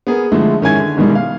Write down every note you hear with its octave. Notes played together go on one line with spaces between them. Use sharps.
B3 G#4 A#4
D3 F3 G#3 A3 E4
G#2 D#3 C#4 E4 G#5 G#6
D3
G#2 B2 D#3 E3 G3 G#3
F5